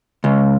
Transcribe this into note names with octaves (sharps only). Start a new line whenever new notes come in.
C#2